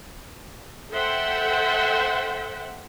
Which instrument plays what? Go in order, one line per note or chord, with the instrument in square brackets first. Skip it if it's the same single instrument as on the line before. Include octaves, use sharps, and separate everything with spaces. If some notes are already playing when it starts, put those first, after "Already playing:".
[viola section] A4 C5 E5 F#5 G5